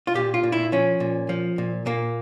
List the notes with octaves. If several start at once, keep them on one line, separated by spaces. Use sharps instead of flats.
F4
A#2 G4
F4
A#2
E4
F3 C#4
A#2
F3
A#2
A#2 A#3